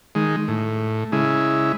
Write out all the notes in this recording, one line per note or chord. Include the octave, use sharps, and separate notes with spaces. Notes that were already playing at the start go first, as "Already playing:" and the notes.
D#3 G#3
A2
C#3 G#3 E4